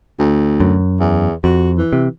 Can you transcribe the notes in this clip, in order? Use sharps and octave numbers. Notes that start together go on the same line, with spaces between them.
D2
F#2
E2
F2 F#4
E3
C3